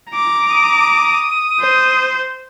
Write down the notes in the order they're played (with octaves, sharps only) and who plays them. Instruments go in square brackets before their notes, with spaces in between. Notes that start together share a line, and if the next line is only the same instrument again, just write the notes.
[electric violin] A#5 D6
[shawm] D#6
[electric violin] C5